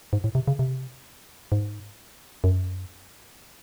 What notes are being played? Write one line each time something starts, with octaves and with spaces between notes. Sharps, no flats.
G#2
A2
C3
C#3
C3
G#2
F#2